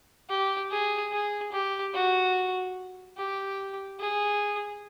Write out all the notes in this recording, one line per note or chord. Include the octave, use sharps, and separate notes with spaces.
G4
G#4
G#4
G4
F#4
G4
G#4